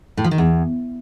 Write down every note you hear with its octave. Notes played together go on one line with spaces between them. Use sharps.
A2
F3
D#3
E2